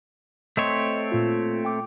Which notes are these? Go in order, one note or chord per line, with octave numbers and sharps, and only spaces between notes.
A3 C4 C#5 D#5 C6
A#2 F4
G5 D6